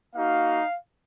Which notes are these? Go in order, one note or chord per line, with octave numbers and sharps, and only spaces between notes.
A#3 D#4 F#4 F5